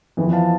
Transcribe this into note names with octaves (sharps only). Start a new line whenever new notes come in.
F2 E3 B3
F5 A5